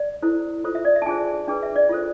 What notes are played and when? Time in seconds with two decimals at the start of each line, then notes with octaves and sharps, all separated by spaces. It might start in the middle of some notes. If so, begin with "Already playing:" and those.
Already playing: D5
0.23 E4 A4 C5
0.64 F4 A4 C5
0.75 E5
0.85 D5
0.96 E5
1.02 A5
1.06 D4 F4 G#4 C5 G#5
1.48 D4 G#4 B4
1.63 E5
1.76 D5
1.89 F4 A4 C5